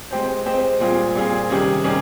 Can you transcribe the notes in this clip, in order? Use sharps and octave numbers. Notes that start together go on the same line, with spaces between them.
G#3 C4 G4 C5
G#3 C4 G4 C5
A#2 G3 C4 F4 G#4
A#2 G3 C4 F4 G#4
C3 D#3 G3 C#4 G#4
C3 D#3 G3 C#4 G#4